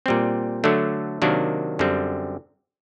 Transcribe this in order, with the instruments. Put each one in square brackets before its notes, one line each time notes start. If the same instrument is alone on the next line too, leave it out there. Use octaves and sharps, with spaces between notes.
[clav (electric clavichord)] A#2 G3 C4
D3 F#3 A3 D4
C3 D#3 F#3 A#3 D4
F#2 D3 G3 C4